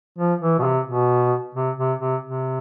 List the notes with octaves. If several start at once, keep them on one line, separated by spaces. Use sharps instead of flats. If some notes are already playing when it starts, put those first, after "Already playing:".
F3
E3
B2
C3
B2
C3
C3
C3
C3